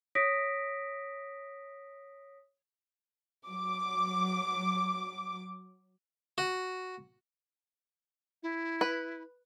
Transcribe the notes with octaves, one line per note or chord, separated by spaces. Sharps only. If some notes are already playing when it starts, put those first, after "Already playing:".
C#5 D#6 A#6 B6 D7
F#3 D6
F#4
E4
B4